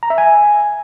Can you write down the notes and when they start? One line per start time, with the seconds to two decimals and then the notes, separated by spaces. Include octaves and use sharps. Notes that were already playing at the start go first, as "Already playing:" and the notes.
0.03 A#5
0.10 E5
0.18 G#5